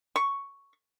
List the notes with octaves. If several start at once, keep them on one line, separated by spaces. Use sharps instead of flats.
C#6